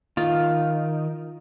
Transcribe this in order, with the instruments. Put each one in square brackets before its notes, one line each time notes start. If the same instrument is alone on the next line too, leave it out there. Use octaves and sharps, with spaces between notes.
[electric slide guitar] D#3 [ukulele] F4